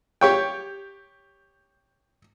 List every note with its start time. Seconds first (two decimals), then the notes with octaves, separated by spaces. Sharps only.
0.21 G4 C#5 G5